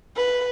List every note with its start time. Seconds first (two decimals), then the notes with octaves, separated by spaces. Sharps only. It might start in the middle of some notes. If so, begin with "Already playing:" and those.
0.16 B4